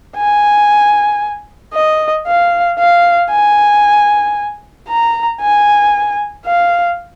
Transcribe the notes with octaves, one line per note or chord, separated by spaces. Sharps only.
G#5
D#5
F5
F5
G#5
A#5
G#5
F5